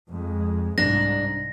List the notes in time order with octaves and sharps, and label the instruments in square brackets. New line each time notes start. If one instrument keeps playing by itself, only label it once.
[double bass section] F2 G#3
[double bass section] C2 G#2 [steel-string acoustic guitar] D4 [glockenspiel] A#6